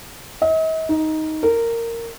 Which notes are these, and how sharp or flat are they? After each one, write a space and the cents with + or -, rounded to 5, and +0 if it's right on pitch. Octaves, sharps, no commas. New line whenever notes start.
D#5 +45
D#4 +10
A#4 -15